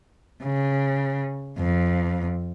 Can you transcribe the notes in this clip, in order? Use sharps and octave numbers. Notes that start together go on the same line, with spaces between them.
C#3
F2